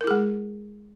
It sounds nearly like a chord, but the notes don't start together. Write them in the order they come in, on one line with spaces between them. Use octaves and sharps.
A#4 E4 G#4 G#3